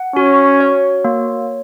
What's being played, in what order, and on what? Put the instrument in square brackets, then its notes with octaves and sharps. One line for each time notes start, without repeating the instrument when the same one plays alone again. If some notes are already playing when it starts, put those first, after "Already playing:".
Already playing: [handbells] F#5
[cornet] C#4 [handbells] F#4
[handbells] C#5
A#3